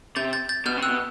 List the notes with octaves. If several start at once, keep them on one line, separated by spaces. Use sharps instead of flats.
C3 G6 A6
G6 A6
G6 A6
B2 F6 G6
C3
E6 F#6
B2